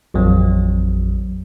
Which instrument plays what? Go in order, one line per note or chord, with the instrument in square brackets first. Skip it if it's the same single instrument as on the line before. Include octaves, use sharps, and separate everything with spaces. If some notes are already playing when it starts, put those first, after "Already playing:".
[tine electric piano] A1 F2 F#3